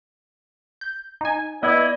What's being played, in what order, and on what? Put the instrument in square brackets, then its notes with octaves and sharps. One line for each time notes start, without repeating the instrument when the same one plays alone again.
[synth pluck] G6
D#4 G#5
[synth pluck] B3 [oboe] E4 [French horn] D5 [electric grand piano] D#5 G#6